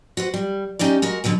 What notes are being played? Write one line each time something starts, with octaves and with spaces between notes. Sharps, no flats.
F#4 B4 C5
G3
C#4 D#4 G4 D5
G#3 F#4 A#4
B2 D3 D#3 F#3 B3